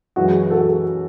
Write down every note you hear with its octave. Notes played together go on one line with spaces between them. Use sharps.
F#2 E3 G#3 F#4
F#4 A4